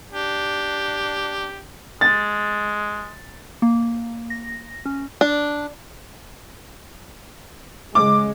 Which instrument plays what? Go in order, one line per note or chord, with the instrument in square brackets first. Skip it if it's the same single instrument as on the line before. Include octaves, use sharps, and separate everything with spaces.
[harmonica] D4 G4
[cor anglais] G#3 [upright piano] A6
[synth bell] A#3
A#6
C#4
[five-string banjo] D4
[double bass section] C#3 G#3 [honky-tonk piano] D6